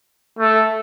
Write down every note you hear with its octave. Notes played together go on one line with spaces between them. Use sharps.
A3